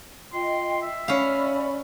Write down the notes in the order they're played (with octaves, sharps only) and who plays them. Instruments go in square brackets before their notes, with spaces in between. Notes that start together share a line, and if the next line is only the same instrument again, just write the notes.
[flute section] F4 D#5 G5 [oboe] C6
[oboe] E5
[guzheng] C#4 F5 [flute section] D5 B5